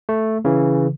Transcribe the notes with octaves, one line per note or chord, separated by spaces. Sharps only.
A3
C#3 E3